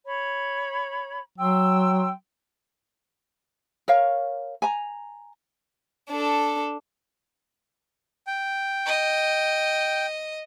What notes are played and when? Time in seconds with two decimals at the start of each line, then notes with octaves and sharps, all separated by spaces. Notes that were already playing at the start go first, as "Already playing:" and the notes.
0.05 C#5 B5
1.38 F#3 G5 C6 E6
3.88 A#4 C#5 F5
4.62 G#5 A#5
6.10 D4 A4
8.27 G5
8.86 D#5